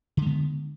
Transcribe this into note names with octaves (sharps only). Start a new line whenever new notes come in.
D3 G#3 B3